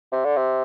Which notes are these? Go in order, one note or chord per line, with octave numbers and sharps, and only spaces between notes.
C3
D3
C3